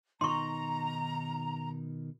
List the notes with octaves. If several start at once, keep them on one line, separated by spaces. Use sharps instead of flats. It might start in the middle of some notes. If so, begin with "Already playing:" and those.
B2 D#3 D#4 A#5 C6 C#6